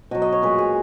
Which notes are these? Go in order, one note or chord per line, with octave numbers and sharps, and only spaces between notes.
B2 F#3 D#5
D#5
C#5
A#2 G#3 B4
G#4